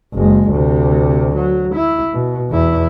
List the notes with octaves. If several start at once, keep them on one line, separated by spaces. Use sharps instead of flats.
F#1 G#3
D2 C3
F#3
E4
B2
E2 E4